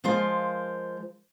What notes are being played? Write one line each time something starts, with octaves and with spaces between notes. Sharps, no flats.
F3 G#3 F4 A#4 C5